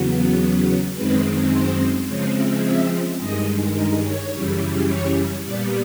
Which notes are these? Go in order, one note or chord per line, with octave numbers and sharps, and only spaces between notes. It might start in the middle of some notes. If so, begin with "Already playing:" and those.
Already playing: E2 C#3 F#3 B3
F#2 D#3 G#3 C4 B4
C5
C#3 F3 G#3 C4 C#5
E5
E5
G2 D#3 G#3 D#5
A#4
C#5
F#2 C#3 E3 G3
C#5
A#2 G3 B3 D5